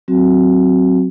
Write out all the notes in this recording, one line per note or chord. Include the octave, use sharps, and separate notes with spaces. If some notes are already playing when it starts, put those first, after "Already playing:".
F#3 C4 F#4